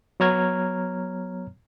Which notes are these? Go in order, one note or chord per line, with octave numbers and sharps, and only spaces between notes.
F#3 B3 C#5 A#5 F6 G#6